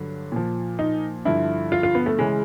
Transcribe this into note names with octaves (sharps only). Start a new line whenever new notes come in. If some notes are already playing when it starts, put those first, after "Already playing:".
Already playing: G2 D3 F#3
A#2 F3
D#4
G2 D3 F3 E4
F4
F4
B3
A3
C#3 E3 G#3